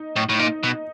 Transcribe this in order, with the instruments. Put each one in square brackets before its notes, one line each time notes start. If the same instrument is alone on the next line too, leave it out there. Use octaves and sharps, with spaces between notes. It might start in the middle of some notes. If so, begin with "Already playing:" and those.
Already playing: [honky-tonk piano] D#4
[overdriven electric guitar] A2
A2
[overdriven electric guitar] A#2 [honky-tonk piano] D#4
[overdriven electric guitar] B2